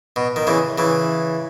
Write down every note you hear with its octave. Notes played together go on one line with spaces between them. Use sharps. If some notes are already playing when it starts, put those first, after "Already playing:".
B2
D#3
C#3 E3
C#3 E3